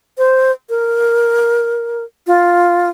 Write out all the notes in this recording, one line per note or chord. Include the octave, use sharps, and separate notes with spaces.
C5
A#4
F4